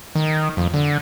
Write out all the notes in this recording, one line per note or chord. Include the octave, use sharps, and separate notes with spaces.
D#3
F2
D3